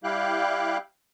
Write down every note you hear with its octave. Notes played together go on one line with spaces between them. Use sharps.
G3 E4 G4 F5 G5 F#6